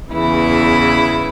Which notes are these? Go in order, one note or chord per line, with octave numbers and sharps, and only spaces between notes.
E2 C#3 E3 E4